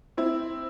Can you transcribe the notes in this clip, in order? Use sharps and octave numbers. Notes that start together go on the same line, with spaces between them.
C4 E4